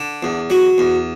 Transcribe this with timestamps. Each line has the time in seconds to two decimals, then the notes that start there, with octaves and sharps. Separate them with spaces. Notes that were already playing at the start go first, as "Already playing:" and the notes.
Already playing: D3
0.23 E2
0.50 F#3
0.78 E2